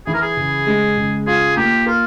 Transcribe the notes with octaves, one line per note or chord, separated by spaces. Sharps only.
E3 G#4
A#4
G#4
C#3
G#3
C#3
F4 G#4
A#3 G4
F4 A#4